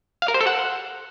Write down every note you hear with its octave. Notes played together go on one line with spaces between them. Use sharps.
F5
A#4
C5
A4
F#5